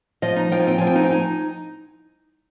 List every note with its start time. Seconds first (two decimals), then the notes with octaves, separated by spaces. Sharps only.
0.22 F3 D#5
0.36 D#4
0.52 F3 G5
0.60 G#5
0.67 C4 G5
0.78 F3 G#5
0.87 G5
0.95 D#4 G#5
1.03 G5
1.11 D#4 G#5